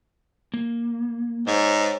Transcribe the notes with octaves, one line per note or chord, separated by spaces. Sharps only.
A#3
G#2 C5 C#5